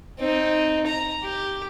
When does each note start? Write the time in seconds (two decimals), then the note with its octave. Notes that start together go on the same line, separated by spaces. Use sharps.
0.19 C4 D#4
0.86 A#5
1.23 G4